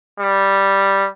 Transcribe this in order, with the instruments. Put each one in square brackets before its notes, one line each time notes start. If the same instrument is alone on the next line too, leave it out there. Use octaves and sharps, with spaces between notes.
[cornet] G3